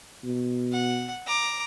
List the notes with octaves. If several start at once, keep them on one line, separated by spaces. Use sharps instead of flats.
B2
F#5
A#5 D6